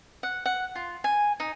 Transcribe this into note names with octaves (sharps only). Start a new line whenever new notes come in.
F#5
F#5
F4
G#5
D#4